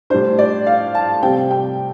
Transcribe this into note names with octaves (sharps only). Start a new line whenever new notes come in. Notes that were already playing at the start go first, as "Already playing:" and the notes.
A2 G3 D4 C5
D5
F5
A5
C3 G3 C4 G5
G5